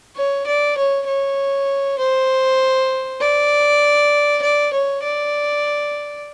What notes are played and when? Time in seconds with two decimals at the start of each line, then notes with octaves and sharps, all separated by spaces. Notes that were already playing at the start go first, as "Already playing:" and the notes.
0.17 C#5
0.47 D5
0.77 C#5
1.07 C#5
1.99 C5
3.21 D5
4.42 D5
4.73 C#5
5.03 D5